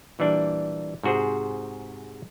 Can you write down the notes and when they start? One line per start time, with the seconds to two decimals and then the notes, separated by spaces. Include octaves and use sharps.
0.19 A#2 E3 G3 D4
1.03 G#2 C3 F#4 G#4 C5